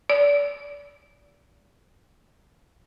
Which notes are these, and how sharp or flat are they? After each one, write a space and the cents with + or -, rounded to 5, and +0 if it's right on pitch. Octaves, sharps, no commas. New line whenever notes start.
D5 -30